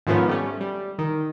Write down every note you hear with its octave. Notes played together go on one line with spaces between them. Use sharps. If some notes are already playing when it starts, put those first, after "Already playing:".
G#2 D#3 F3 A3 B3 C#4
G3 A3 C#4
G3
D#3